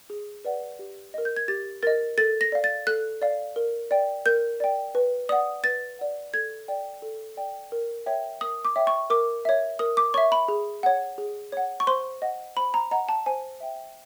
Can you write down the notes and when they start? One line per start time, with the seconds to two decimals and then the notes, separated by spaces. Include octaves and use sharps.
0.10 G#4
0.45 B4 D5 F#5
0.79 G4
1.14 A#4 D#5
1.25 G6
1.36 G#6
1.48 G4 A6
1.83 A#4 D#5 A6
2.18 A4 A6
2.41 A#6
2.52 D5 F5
2.64 A6
2.87 A4 F#6
3.22 D5 F5
3.56 A#4
3.91 D5 G5
4.26 A#4 G6
4.60 D5 G5
4.95 B4
5.29 D5 F#5 D#6
5.64 B4 A6
5.99 D5 F#5
6.34 A4 G#6
6.68 D5 G5
7.02 A4
7.37 D5 G5
7.72 A#4
8.06 C#5 E5 G5
8.41 A#4 D#6
8.65 D6
8.76 C#5 E5 G5
8.87 C#6
9.10 A#4 D6
9.45 C#5 E5
9.79 A#4 D#6
9.97 D6
10.14 C#5 E5 C#6
10.32 B5
10.48 G#4
10.83 C#5 F#5
11.18 G#4
11.52 C#5 F#5
11.80 C#6
11.87 C5 C6
12.22 D#5 F#5
12.57 C5 B5
12.74 A#5
12.91 D#5 F#5 A#5
13.09 A5
13.26 C5 G#5
13.60 E5 G5